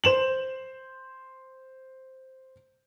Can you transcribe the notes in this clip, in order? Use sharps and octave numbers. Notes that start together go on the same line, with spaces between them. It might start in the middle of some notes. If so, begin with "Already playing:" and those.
C5 E7 F#7